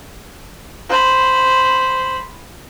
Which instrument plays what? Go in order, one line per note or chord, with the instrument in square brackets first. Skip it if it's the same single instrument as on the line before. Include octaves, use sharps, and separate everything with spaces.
[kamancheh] C5 B5